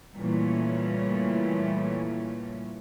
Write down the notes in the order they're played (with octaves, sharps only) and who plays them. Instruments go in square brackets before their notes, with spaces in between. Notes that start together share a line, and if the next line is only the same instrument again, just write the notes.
[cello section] A#2 C#3 E3 G3 A3 C#4